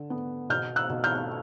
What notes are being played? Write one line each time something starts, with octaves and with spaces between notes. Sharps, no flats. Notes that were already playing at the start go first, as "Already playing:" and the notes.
Already playing: D3
B3
B2 F6 G6
E6 F#6
B2
F6 G6